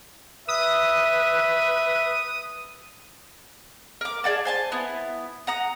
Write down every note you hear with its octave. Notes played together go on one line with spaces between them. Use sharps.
B4 E5 D#6
A#4 D6
G#4 D5 F#5 A5
C5 G#5 A5
B3 E4
F#5 A#5 D#6